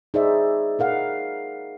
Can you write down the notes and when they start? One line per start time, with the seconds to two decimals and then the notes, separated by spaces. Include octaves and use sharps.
0.14 D#4 G#4 C5 D5 E5
0.79 D#4 A#4 F5 F#5